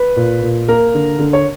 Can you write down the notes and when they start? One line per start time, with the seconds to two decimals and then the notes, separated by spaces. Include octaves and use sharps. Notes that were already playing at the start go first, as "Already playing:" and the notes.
Already playing: B4
0.16 A#2
0.42 A#2
0.68 A#3 A#4
0.94 D3
1.19 D3
1.33 C#5